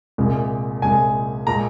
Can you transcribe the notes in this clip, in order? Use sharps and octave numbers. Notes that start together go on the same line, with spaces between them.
C2 A#2 G#3
C2 A#2 G#3 G#5
A#2 G#3 A#5